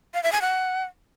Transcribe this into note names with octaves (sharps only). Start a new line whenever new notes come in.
F5
E5
G#5
F#5